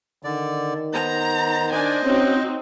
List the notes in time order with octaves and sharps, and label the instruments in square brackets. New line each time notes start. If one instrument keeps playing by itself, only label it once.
[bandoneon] D3 D5 [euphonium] D#3
[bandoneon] B3 C5 [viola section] A#5
[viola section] D4 D5 G#5 [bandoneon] C5 D#5
[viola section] C4 D#4 F#4 [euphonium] C#4